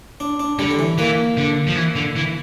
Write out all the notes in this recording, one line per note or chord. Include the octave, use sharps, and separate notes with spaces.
D4
D4
D3 G3
D3
E3
E3 A#3
D3
F3
E3
D3
E3